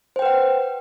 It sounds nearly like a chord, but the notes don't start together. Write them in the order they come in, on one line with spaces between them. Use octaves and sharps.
C5 G5 B4 F#5